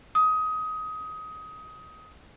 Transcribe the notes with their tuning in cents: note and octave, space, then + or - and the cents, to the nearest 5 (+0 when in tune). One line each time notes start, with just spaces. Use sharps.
D#6 +20